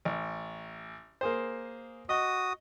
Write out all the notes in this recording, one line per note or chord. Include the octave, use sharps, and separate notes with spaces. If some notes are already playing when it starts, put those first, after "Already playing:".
A1
A#3 G#4 C5
F#4 D#5 D#6